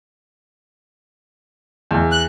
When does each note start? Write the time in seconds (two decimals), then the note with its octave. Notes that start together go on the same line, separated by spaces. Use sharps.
1.91 E2
2.12 F#6